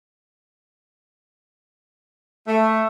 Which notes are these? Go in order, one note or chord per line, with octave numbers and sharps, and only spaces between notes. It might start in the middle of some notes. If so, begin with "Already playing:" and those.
A3